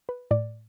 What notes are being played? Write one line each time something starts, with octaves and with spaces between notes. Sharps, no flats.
B4
A2 D5